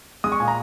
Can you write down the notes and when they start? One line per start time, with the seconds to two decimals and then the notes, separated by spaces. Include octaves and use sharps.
0.24 G#3 D#6
0.32 C#6
0.40 A#2 G#5
0.48 A#5